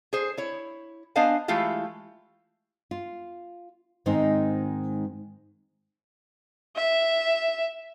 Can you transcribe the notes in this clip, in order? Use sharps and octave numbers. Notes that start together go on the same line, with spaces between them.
G#4 C5
E4 C#5
B3 D4 C5 D#5 F5 G#5
E3 G#3 A3 E4 F4 G4
F4
G#2 D#3 G#3 C4 D#4 C5
E5